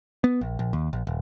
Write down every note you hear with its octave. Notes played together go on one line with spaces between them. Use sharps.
B3
A#1
A#1
D#2
A#1
D#1